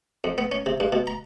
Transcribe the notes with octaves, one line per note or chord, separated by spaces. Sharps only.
F2
B3
C#4
C3
G2
B2
A#5